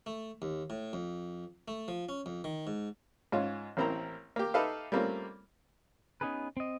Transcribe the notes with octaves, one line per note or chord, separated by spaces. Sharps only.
A3
D#2
A2
F2
A3
F3
C#4
F2
D#3
G#2
G#2 C#4 F4
A1 A#3 C4 E4 A#4 A#5
A#3 G4
D#4 G4 A4 B4 E5 F5
G3 A3 A#3 C4 C#4 F4
B3 C#4 D#4 G#4 A4 B4
C4 D#5